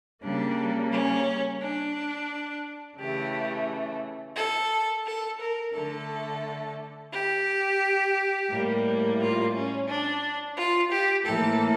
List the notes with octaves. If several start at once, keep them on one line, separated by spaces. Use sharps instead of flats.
C#3 G3 A#3 D4
C#4
D4
C#3 E3 A3 G4
A4
A4
A#4
D3 A3 A4
G4
A2 G3 A#3
F4
C#4
D4
F4
G4
A2 E3 A#3 A4